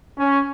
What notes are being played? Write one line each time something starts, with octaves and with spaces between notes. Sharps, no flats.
C#4